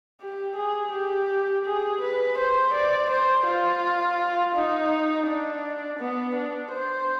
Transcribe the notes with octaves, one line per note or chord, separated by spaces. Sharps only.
G4
G#4
G4
G#4
B4
C5
D5
C5
F4
D#4
D4
B3
D4
C5